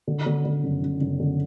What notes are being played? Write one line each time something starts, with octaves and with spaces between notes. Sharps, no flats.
D3
D3
D3
F#1
F#1
F#1
D3